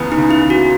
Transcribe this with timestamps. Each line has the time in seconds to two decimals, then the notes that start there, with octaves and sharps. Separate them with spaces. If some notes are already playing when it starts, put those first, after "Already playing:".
Already playing: C#2 C#3 E3 B3
0.12 D#4
0.18 C#3
0.31 E4
0.44 E3
0.50 F#4